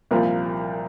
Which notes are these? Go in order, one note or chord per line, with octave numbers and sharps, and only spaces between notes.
C2 A#2 F3 A#4